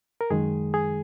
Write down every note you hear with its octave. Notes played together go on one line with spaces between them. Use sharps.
A#4
F#2 D#3 G#3 G#4
G#4